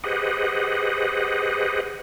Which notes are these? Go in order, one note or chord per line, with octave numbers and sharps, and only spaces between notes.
G4 G#4 B4 C5 D#5 F#5